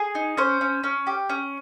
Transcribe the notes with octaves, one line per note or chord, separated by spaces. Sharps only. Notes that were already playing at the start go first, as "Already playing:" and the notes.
Already playing: G#4
D#4
C#4 C5
C#4
C#4
G4
C#4